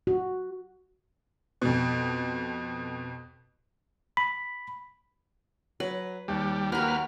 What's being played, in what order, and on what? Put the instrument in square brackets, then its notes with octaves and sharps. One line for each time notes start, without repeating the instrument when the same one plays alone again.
[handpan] F#4
[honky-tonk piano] F2 B2
[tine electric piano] B5
[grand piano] F#3 [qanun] B4
[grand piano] D#2 [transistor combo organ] G3
[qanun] F#3 G4 [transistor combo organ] A#3 B4 F6